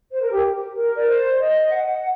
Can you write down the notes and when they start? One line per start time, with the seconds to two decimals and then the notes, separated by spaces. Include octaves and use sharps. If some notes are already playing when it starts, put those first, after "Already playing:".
0.11 C5
0.21 A#4
0.31 G4
0.74 A#4
0.95 D5
1.06 C5
1.38 D#5
1.70 F#5
1.86 F#5